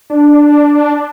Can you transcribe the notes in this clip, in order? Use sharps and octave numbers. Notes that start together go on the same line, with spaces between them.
D4